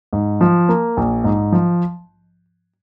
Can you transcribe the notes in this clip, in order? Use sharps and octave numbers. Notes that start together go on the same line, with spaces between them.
G#2
F3
A#3
A#1
G#2
F3